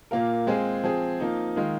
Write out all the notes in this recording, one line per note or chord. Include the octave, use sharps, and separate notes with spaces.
A#2 A#3 F4 A#4
G#3 C4 F4 G#4
F3 C4 G#4
F3 A#3 D#4
D#3 G#3 F4